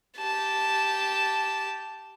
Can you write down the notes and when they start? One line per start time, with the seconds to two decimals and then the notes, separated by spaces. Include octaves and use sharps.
0.18 G4 A5